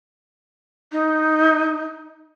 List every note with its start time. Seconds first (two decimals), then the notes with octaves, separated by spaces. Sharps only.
0.92 D#4